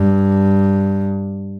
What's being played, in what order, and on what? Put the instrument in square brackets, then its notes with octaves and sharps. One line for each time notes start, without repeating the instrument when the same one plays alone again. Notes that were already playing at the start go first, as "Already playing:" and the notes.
Already playing: [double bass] G2